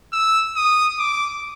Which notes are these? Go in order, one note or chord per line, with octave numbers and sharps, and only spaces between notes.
E6
D#6
D6